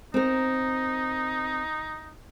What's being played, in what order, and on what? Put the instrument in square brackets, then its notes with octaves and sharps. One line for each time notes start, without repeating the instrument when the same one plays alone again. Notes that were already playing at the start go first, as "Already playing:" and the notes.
[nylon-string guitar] C4 A#4 [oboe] D#4